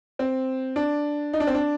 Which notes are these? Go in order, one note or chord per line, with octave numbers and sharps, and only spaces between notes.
C4
D4
D#4
D4
C4
D4